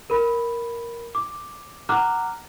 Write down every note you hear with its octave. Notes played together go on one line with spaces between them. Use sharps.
A#4 B5
D6
F#5 A#5 D6 F6 F#6